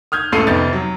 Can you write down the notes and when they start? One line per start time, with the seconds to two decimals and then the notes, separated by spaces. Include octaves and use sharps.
0.12 D#6 F6 G6 G#6
0.32 C#2 A2 A4 C7 D#7
0.47 F2 C3 D#3 B3 G6 A6
0.73 F#3